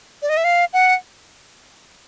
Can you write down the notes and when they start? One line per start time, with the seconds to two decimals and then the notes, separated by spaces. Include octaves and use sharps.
0.22 D5
0.29 D#5
0.37 E5
0.44 F5
0.73 F#5